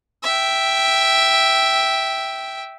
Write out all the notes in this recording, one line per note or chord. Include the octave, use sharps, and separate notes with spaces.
E5 G5